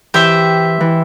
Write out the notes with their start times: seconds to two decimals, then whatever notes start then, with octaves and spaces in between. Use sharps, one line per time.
0.14 E3 G4 C5 E5
0.80 E3